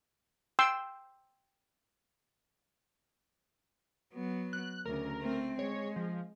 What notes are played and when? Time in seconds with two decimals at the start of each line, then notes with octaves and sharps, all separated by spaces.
0.59 G5 C6 E6
4.14 F#3 B3
4.53 F#6
4.86 D2 C#3 A#4
5.20 A3 C4
5.59 G#3 C#5
5.96 F3